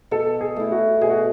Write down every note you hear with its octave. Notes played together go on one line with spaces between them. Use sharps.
B2 A4
G#4
A3 E4
F#4
B2 G#4
F#4